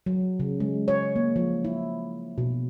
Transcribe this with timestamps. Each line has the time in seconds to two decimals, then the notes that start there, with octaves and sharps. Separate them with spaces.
0.06 F#3
0.40 C#3
0.60 G#3
0.88 C#5
1.16 A#3
1.36 F3
1.65 E4
2.38 B2